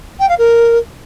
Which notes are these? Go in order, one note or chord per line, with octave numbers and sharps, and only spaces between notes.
G5
F5
A#4